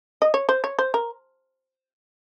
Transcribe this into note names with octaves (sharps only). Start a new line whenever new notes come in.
D#5
C#5
C5
C#5
C5
A#4